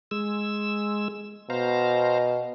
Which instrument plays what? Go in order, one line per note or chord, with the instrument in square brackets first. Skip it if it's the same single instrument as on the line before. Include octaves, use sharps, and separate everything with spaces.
[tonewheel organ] G#3 E6
[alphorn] B2 [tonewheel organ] C5 F5 A#5